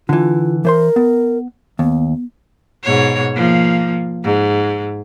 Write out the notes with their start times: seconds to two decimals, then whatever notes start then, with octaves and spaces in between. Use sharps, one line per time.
0.09 D3 E3 F4
0.65 E3 A#4 C5 C6
0.96 B3
1.79 D#2 B3
2.83 G#2 B2 C#5
3.35 F3 A#3
4.24 G#2